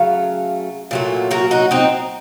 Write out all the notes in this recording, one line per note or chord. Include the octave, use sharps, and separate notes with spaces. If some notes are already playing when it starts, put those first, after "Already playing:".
Already playing: C#3 F#3 A3 F5
A#2 F#3 A3
F#4 A#4
D#4 F#4
C4 D#4